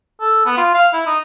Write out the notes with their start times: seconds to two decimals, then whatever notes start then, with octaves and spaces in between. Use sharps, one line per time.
0.21 A4
0.46 B3
0.57 F4
0.74 F5
0.93 E4
1.07 D#4